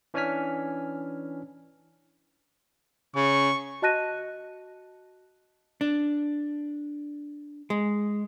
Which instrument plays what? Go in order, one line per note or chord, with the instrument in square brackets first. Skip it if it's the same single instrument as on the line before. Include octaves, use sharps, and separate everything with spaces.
[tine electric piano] E3 C#4 D4 G#5 F6 B6
[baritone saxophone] C#3 [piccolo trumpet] C#6
[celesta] F#4 D#5 A5 F#6 A#6 D#7
[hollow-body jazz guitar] D4
G#3